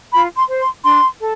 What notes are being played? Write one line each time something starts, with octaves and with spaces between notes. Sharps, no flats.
F4 B5
C6
C5
C6
D4 C6
A4